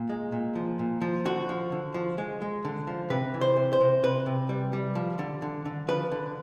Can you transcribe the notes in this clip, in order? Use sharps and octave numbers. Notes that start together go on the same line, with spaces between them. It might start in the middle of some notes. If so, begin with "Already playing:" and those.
Already playing: A#2
G#3
A#2
F3
A#2
F3
D3 F#4
F3
D3
F3
G#3
G#3
D3
F3
C3 B4
E3
C5
C3
C5
C3
C3 B4
C3
G3
G3
F3
D3
D3
D3
F3 B4
D3